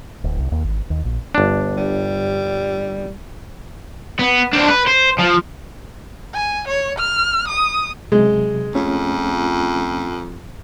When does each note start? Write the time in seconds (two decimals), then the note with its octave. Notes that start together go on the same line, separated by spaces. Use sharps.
0.24 D1
0.38 C2
0.52 D#2
0.64 G#1
0.90 D#2
1.05 A#1
1.35 G1 D4
1.77 G3
4.19 B3
4.53 D4 C5
4.68 B4
4.87 C5
5.19 F3
6.34 G#5
6.68 C#5
6.99 F6
7.48 D#6
8.12 C3 F#3 G#3
8.74 F2 A3 C#4 F4